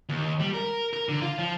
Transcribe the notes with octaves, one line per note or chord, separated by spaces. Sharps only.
D#2
G3
A#4
A#4
D3
F4
F3